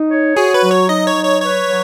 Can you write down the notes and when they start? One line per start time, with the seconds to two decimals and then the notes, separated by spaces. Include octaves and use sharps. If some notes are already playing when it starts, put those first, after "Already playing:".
Already playing: D#4
0.11 C#5
0.36 F#4 G#4
0.54 B4
0.63 F#3
0.71 C#5
0.89 D#4 D#5
1.07 C#5
1.15 F#3
1.25 C#5
1.42 B4 C#5
1.68 F#3